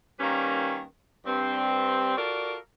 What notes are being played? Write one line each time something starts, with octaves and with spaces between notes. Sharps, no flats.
D#3 G3 A#3 C#4 B4
G2 C4
F4 F#4 A4 A#4 D5